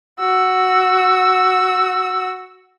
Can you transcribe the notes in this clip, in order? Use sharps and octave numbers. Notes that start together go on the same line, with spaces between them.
F#4 E6